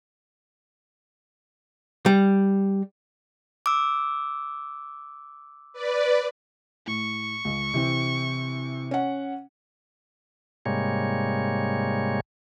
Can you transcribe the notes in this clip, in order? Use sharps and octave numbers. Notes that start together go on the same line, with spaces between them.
G3
D6 E6
B4 D5
A2 C#6
C#2
C3 E3 C4
C#4 F#5
G#2 C3 G3 G#3 A#3 C#5